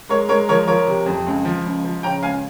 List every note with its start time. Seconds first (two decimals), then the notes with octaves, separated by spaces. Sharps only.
0.09 G#3 A#4 C#5
0.29 G#3 A#4 C#5
0.49 F3 A#4 C#5
0.67 F3 A#4 C#5
0.87 C3
1.06 F2
1.27 C#2
1.45 F3
1.65 C#2
1.85 F3
2.03 C#3 G5 A#5
2.23 C#2 F5 G#5